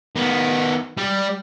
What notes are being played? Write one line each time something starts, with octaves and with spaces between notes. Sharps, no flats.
D#3 B3
G3